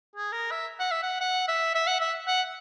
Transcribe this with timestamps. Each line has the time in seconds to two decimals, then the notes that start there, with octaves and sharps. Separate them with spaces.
0.16 G#4
0.32 A#4
0.51 E5
0.80 F#5
0.91 E5
1.03 F#5
1.21 F#5
1.48 E5
1.75 E5
1.87 F#5
2.00 E5
2.27 F#5